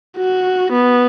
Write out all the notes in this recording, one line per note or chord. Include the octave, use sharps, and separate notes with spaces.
F#4
B3